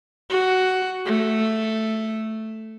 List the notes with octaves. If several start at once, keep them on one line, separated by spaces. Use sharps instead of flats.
F#4
A3